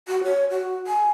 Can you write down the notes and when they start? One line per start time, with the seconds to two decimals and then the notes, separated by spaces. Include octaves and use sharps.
0.08 F#4
0.24 C#5
0.50 F#4
0.87 G#5